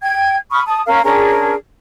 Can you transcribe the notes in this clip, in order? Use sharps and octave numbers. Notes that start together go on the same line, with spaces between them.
G5 G#6
B5 C#6 D#6 F6
A5 D#6
C#4 A#4 F5
C#4 D4 G#4 A#4